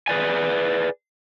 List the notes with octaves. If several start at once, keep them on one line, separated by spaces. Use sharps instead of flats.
G#4 B4 D5 G#5